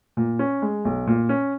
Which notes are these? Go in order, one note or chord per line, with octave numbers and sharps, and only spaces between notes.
A#2
C#4
G#3
B1
A#2
C#4